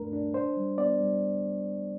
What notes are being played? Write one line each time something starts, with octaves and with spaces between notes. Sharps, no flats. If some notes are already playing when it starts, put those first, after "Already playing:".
Already playing: D2 G2 A3 D4 A#4 B4
D4
D4 C5
G3
B3 D5
G3